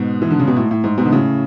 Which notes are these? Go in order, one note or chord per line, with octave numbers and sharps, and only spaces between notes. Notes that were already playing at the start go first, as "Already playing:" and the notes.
Already playing: G#2 B2
E3
D3
C#3
B2
A2
A2
G#2
G#2 B2
D3
A2 C#3